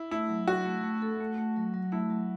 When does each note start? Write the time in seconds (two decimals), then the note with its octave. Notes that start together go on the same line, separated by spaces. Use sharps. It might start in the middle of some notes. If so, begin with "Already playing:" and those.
Already playing: E4
0.11 A3 E4
0.29 F#3
0.48 F#3 F#4
0.66 A3
0.84 A3
1.02 A4
1.20 A3
1.38 A3
1.56 F#3
1.74 F#3
1.92 A3 E4
2.10 F#3